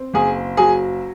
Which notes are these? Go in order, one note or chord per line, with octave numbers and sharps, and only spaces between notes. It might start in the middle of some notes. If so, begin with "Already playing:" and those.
Already playing: C4
F#1 G#4
F#3 G#4